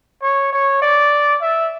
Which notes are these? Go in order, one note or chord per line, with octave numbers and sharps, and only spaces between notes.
C#5
C#5
D5
E5